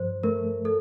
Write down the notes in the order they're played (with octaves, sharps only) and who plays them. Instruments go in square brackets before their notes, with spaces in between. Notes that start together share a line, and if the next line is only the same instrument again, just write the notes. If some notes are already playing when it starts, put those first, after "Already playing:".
Already playing: [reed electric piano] G2 F3 [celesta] C5
[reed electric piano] A3 [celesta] A#4
[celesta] A4